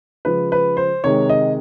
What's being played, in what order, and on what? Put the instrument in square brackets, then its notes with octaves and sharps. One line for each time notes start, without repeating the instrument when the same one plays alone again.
[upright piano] C#3 F3 G#3 B4
B4
C5
C3 D#3 G#3 C#5
D#5